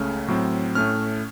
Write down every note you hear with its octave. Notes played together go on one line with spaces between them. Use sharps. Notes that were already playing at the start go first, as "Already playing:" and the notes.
Already playing: C#2 C#3 A3 C#4 F6
A2 F#3 C4
A2 A3 C#4 F6